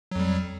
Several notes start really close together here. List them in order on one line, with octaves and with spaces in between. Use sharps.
F#3 F2 G3